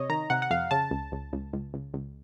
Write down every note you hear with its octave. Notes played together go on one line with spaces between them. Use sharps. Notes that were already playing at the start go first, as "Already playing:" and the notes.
Already playing: C3 C#5 D#5
D#3 A#5
C3 F#5
F#5
F2 F5
C#3 A5
C#2
C#2
C#2
C#2
C#2
C#2